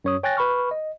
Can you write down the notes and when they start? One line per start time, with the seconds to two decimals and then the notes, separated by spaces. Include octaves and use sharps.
0.04 F#2 C#5 D#6
0.23 C#5 G5 G#5 F#6 A6 A#6
0.37 B4 B5 C#6 F6
0.71 D#5